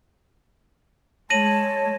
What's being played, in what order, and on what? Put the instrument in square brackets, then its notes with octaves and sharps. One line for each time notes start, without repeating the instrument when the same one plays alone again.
[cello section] G#3 [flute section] C#5 [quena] A5 [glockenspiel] A#6 D#7 F#7